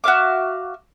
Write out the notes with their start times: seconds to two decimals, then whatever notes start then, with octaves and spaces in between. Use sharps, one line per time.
0.04 F#4 E5 F5 D6